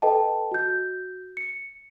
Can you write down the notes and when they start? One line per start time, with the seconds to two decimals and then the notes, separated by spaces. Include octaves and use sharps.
0.02 A4 B4 D#5 G5 A5
0.52 F#4 G6
1.37 C#7